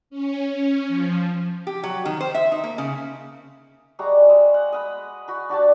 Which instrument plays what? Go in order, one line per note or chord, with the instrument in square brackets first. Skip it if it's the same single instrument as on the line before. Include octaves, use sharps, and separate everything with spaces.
[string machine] C#4
F3
[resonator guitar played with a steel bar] G4
F#3
D#3
C5
E5
D#4
A#3
C#3
[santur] G3 G#3 F#4 A#5
G#3
F#5
D#5 F#5 B5
F#4 B5
D4 F#4 G4 A5